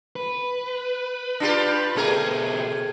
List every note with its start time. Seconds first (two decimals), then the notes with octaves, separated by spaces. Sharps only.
0.16 B4
1.40 D4 F4 G4
1.96 B2 A3 G4 G#4 A#4